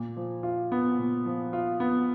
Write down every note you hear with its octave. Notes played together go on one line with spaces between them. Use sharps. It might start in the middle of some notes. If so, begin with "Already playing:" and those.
Already playing: A#2
F3
F4
B3
A#2
F3
F4
B3